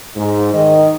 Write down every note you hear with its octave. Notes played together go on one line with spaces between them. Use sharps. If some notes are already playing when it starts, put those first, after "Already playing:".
G#2
D#3 D#5